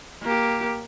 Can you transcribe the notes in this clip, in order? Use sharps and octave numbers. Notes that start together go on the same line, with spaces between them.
A#3 G4